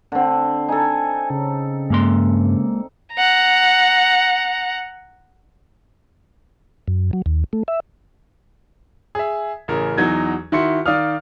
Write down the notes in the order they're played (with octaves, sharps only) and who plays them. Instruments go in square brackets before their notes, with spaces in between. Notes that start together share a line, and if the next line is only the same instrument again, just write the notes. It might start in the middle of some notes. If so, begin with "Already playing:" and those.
[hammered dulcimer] D3 C4
[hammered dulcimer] D#4 A4 [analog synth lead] G#5
[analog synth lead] C#3
[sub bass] G2 [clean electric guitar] G#3 A#3 C6
[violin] F#5 A#5
[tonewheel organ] F#2
F#3
D#2
A3
E5
[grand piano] G#4 E5
A1 C#3 A#4
E2 F#3 D#4 G#6
D#3 E4 F#4 C6 C#7
D#3 D5 F5 D#6 F6